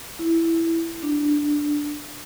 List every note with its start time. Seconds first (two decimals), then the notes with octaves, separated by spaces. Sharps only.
0.19 E4
1.03 D4